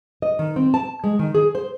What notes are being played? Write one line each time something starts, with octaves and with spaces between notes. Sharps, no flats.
D#5
D#3
C4
A5
G#3
D#3
G#4
C5